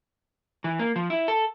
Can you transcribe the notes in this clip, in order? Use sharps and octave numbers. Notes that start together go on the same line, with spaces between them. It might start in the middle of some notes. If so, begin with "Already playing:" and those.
E3
A#3
F3
E4
A4